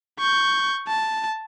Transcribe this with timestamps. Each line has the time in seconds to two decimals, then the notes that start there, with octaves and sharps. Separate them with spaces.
0.19 C#6 G6
0.88 A5